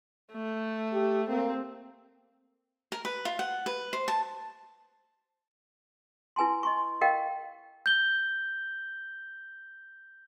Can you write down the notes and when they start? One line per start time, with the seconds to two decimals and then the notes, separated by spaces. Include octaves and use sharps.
0.32 A3
0.93 G4
1.29 A#3 C4
2.92 A#4
3.05 B4
3.25 F4
3.39 F#5
3.66 B4
3.93 C5
4.08 A5
6.36 E4 B4 G#5 A5 C6
6.63 D#5 C6 C#6
7.01 A#4 D#5 F5 G5 C#6
7.86 G6 G7